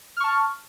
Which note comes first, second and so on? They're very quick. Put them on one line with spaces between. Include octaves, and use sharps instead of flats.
F6 C#6 A5